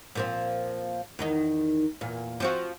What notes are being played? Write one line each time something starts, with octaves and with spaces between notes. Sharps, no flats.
A#2 F3 C4
E2 D#3 D#4
E2 A#2
F3 C4 F#4